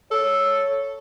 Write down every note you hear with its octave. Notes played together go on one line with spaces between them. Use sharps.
A4 C#5